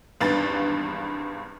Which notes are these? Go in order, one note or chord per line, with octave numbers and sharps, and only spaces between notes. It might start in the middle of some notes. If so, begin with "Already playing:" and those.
G#1 E2 G2 B4 B5 A6